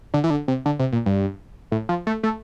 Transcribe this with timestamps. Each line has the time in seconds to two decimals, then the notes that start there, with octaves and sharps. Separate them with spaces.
0.14 D3
0.24 E3
0.30 D3
0.48 C3
0.66 D3
0.79 C3
0.92 A#2
1.06 G2
1.72 A2
1.89 F3
2.07 A3
2.23 A3